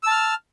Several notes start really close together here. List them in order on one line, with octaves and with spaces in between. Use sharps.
E6 A5 F6